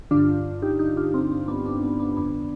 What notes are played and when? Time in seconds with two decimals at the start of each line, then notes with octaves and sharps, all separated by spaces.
0.11 G2 D3 D4 F4
0.62 D#4 G4
0.79 D#4 G4
0.97 D4 F4
1.14 C4 D#4
1.31 C4
1.48 B3 D4
1.65 B3 D4
1.83 B3 D4
1.99 B3 D4
2.17 F2 D3 B3 D4